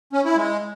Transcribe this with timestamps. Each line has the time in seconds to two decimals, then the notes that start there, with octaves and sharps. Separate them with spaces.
0.13 C#4
0.25 E4
0.37 G#3